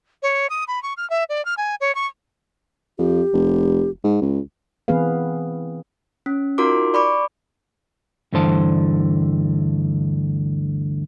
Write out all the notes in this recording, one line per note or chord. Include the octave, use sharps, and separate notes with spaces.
C#5
D#6
B5
C#6
F6
E5
D5
F6
G#5
C#5
C#6
F2 G4
F1
G#2
C#2
E3 B3 C4 G#4 B4 F5
C#4
D#4 F4 F#4 A#4 C6 D6
D5 B5 C#6 D6
D2 G2 D3 E3 C5 A5